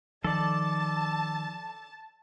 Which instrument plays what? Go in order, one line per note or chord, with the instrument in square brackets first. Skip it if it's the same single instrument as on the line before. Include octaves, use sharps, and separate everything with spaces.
[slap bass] D#3 [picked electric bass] F3 [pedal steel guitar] A4 D5 [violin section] A5